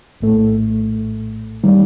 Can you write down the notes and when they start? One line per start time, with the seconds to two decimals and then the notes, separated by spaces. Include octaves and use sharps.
0.20 A#1 A2 A3
1.64 D#3 G3